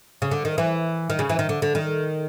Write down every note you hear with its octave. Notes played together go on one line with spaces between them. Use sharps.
C#3
D3
D#3
E3
D#3
C#3
E3
D#3
D3
D3
D#3